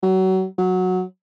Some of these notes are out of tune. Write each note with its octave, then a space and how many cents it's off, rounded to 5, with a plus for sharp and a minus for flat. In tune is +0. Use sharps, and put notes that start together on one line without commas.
F#3 +30
F#3 -10